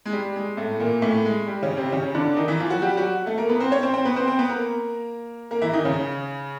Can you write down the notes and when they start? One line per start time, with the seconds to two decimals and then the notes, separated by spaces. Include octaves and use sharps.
0.06 G#3
0.13 G3
0.36 G#3
0.57 A2 A3
0.79 A#2 A#3
1.02 A2 A3
1.25 G#3
1.47 G3
1.62 C#3 C#4
1.77 C3 C4
1.92 C#3 C#4
2.15 D3 D4
2.37 D#3 D#4
2.48 E3 E4
2.60 F3 F4
2.70 F#3 F#4
2.82 G3 G4
2.97 F#3 F#4
3.26 A3 A4
3.38 A#3 A#4
3.49 B3 B4
3.60 C4 C5
3.71 C#4 C#5
3.83 C4 C5
3.94 C4 C5
4.05 B3 B4
4.16 C4 C5
4.28 C4 C5
4.39 B3 B4
4.49 A#3 A#4
5.51 A#3 A#4
5.62 E3 E4
5.73 D#3 D#4
5.85 C#3 C#4